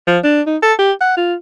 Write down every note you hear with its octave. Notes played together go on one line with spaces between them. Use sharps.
F3
D4
D#4
A4
G4
F#5
F4